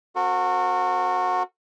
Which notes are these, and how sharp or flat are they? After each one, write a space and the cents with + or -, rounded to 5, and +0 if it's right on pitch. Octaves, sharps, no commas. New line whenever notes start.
C4 +0 F#4 -20 A#4 -45